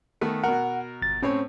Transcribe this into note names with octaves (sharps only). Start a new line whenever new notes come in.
D#3 A3 B3
B2 A#4 F#5
G1 A6
A2 C4 C#4 C#5